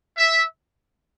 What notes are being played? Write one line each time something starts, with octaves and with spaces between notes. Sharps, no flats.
E5